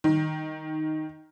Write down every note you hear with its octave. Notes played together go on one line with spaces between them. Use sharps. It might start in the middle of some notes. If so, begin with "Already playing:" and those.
D#3